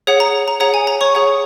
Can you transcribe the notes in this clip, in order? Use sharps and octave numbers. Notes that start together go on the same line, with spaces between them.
G#4 C#5 F#5
A#5
A#5
G#4 C#5 F#5 A#5
G#5
A#5
C#5 C#6
G#4 C#5 F#5